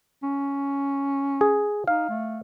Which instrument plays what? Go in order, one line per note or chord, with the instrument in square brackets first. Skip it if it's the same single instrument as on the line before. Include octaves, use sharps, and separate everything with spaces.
[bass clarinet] C#4
[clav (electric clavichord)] G#4
[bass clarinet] D#4 [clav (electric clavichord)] F5
[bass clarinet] A3